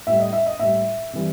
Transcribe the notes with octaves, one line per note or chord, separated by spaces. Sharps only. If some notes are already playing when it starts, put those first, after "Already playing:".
A2 G3 E5
D#5
E5
D#5
A2 G3 E5
C3 E3 G3